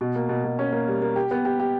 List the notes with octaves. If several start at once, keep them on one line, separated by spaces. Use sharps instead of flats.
B2
A#3
B2
B2
C#4
A#3
G3
A#3
G4
B3
G4
G4